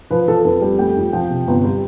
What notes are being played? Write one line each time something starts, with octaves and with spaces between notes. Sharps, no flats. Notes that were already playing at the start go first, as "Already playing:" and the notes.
F3 B4
F3 A4
F2 B4
G3
A3 G5
F2
F3 G5
C3
G1
G3